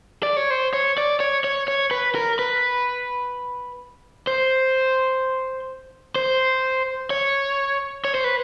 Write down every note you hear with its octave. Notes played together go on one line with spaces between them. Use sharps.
D5
C#5
C5
C#5
D5
C#5
C#5
C#5
B4
A#4
B4
C5
C5
C#5
C#5
C5
B4